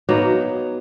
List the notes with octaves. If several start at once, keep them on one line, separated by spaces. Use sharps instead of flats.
F#3 A#3 B3 D#4